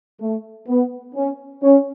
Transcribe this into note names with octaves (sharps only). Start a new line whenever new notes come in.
A3
B3
C#4
C#4